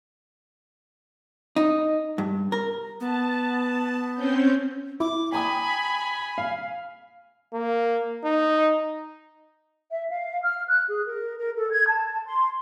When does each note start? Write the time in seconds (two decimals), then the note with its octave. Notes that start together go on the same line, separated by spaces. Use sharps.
1.56 D#4
2.18 G2
2.52 A#4
3.00 B3 A5
4.15 C4 C#4 G6
5.00 E4 D6
5.32 G5 G#5 A#5 B5 D#6
6.38 F5
7.53 A#3
8.24 D#4
9.91 E5
10.10 F5
10.43 F6
10.68 F#6
10.87 G#4
11.06 A#4
11.38 A#4
11.57 A4
11.70 G#6
11.87 A5
12.26 C6